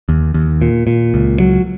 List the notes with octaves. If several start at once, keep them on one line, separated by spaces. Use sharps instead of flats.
D#2
D#2
A#2
A#2
C#2
F#3